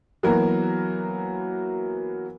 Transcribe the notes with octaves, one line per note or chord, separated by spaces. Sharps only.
E3 F#3 A#3 B3 F#4 A#4